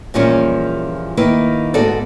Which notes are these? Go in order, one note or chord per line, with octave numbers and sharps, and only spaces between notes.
E2 A#2 F3 G3 C#4 A#4
D#3 A#3 E4 B4
D2 G#2 B3 F#4 A4 D5